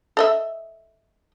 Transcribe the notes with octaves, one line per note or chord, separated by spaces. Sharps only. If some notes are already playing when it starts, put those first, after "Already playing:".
A4 D#5 E5